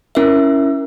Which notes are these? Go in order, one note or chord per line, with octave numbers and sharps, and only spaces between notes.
C#4 E4 A#4 E5